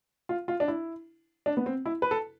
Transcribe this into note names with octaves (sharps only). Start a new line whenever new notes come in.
F4
F4
D4
E4
D4
B3
C4
E4
B4
A4